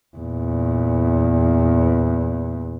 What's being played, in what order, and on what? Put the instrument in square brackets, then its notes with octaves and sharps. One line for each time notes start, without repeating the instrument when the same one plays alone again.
[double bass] E2 A#2